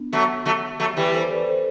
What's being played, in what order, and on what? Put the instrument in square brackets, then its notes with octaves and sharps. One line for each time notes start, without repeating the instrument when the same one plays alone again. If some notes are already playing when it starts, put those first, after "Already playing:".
Already playing: [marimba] B3 D4
[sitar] F#3 A3
F#3 A3
F#3 A3
E3 G3
[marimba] A4 C5
B4 D5
A4 C5